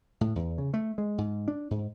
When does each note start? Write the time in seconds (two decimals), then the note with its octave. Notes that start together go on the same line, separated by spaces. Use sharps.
0.21 A2
0.36 E2
0.58 C#3
0.74 A3
0.98 G#3
1.18 G#2
1.48 D4
1.71 G#2